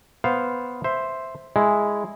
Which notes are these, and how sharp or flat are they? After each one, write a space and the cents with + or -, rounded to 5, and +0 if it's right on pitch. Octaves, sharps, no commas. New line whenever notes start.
B3 +0 C5 +0 F5 +0
C5 +0 E5 +0
G#3 +0 E4 +0